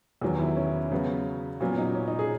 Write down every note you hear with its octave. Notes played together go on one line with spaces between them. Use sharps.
E2 D#3 F#3
E4
C#4
C#3 F#3 B3
A#2 F#3 B3 C#4
D#4
C#4
D#4
G#4